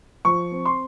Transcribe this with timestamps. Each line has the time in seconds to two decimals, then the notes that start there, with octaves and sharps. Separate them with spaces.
0.25 F3 C#6
0.52 C4
0.65 C6